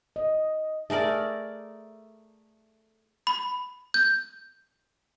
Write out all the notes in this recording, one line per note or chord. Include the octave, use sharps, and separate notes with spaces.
D#5
A3 G#4 A#4 D5
B5
G6